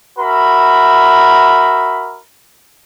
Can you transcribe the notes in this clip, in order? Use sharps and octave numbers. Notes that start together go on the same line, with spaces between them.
F#4 A#4 E5 B5